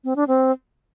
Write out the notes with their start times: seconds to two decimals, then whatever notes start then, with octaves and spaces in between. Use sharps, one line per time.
0.04 C4
0.16 D4
0.28 C4